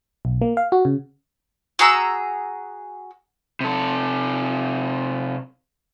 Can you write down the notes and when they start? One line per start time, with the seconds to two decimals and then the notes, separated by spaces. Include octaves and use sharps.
0.25 B1
0.42 A#3
0.57 F5
0.72 F#4
0.85 C#3
1.79 F#4 G#4 A#5 E6
3.61 C3 A4